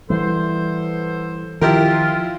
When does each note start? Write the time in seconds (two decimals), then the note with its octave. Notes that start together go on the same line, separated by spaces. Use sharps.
0.10 E3 G3 B3 A4 C5
1.61 D#3 F3 E4 F4 G4 A#4